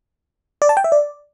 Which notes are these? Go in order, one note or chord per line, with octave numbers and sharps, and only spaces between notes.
D5
A5
G5
E5
D5